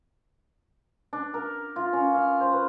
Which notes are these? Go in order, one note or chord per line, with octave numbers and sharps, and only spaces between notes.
D4
A#4
F4
C#4
F5
C5
B4